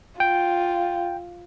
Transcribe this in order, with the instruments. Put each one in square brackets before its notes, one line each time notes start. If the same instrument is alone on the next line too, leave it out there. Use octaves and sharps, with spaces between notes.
[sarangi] F4 [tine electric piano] G5